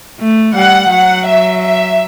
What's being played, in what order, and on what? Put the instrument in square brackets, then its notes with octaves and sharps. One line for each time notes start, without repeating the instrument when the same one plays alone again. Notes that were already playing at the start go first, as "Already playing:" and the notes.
[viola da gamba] A3
[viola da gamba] G3 [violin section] F#5
[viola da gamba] F#3 [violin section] F#5
[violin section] E5
E5